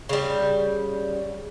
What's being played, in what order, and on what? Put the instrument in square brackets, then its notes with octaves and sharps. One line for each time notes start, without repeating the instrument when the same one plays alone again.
[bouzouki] C#3 G3